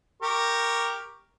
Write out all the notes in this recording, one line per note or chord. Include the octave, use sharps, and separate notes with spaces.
G4 A#4 C#6